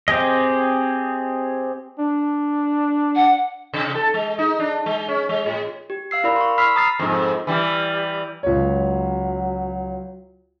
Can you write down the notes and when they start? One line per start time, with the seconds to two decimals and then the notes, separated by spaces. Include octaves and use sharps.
0.08 C4 G4 G#4 D#5
1.99 D4
3.16 F#5
3.73 C3
3.95 A4
4.14 G#3
4.39 D#4
4.60 D4
4.86 G#3
5.08 C#4
5.29 G#3
5.46 A2
5.90 G4
6.11 F5 E6 C7
6.24 E4 A#4 D5 B5 E6
6.36 C6 C#6
6.58 B5 E6 F6 B6 C7
6.76 A#5 D#6 F6 A6 C7
6.99 F2 G#2
7.47 E3 G3
8.43 C#2 F#3 C#5